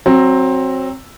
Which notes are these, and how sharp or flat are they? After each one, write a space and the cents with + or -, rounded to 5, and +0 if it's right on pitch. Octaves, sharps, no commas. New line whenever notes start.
F#3 +0 C4 +15